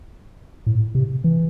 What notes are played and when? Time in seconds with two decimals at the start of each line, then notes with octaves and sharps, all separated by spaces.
0.66 A2
0.95 C3
1.24 E3